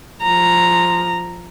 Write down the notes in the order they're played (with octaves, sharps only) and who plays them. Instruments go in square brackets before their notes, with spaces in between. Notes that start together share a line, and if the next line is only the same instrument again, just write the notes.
[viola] F3 A#5